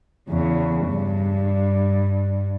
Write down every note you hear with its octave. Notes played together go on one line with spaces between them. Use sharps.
E2 C#3
G2